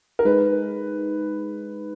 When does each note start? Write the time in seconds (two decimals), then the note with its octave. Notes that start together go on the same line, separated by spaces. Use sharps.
0.19 A#4
0.25 G#3 D#4 G#4 B4